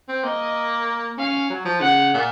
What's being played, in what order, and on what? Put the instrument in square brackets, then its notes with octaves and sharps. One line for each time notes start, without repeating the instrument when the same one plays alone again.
[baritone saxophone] C4
[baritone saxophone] A#3 [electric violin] D#5
[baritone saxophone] C#4 [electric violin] F5
[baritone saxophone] F#3
F3
[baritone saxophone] C#3 [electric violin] F#5
[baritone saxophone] A#2